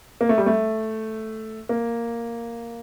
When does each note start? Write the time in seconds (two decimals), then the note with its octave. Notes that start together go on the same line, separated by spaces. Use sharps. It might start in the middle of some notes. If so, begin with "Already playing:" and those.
0.21 A#3
0.29 A3
0.38 G3
0.46 A3
1.69 A#3